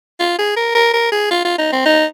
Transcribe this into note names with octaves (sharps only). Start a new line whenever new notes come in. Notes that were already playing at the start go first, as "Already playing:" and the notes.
F4
G#4
A#4
A#4
A#4
G#4
F4
F4
D#4
C4
D#4